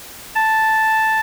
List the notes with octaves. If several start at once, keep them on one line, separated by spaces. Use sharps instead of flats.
A5